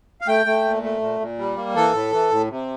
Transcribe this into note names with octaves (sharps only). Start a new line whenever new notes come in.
F5
A3 G5
A3
A#2
A3
A#2
A#2
G3
A#3
E3 A4
A2
E3
A2
C3